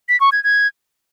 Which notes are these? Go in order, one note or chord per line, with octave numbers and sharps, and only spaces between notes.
B6
C#6
G#6
G#6